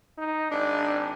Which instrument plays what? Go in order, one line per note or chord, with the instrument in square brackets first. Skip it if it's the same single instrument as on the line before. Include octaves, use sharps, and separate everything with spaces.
[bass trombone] D#4
[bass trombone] G#1 [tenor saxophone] D4